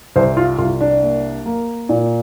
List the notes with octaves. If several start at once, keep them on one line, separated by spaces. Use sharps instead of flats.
C2 C5
F4
C2 F4
D4
A#3
A#3
A#2